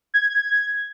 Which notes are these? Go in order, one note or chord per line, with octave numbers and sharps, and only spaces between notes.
G#6